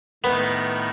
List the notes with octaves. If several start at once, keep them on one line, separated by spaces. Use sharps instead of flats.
A2 D#3 B3